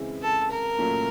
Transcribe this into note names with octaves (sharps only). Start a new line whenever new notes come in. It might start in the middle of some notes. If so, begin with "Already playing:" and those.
Already playing: C#3 E3 G#3 C4 E4
A4
A#4
A#2 F#3 A3 C#4